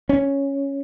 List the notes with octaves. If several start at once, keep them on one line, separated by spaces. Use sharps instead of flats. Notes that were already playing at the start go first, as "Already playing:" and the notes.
C#4